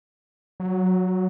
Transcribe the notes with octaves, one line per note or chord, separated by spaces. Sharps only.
F#3